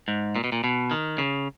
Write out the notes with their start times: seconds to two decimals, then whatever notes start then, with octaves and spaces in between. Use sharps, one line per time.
0.08 G#2
0.36 A#2
0.44 B2
0.52 A#2
0.64 B2
0.91 D#3
1.18 C#3